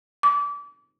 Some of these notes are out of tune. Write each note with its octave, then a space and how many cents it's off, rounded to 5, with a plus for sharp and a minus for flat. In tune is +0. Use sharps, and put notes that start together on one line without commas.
D6 -30